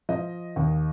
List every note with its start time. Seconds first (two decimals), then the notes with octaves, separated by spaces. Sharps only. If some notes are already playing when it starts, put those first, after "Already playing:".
0.09 F3 D#5
0.56 D#2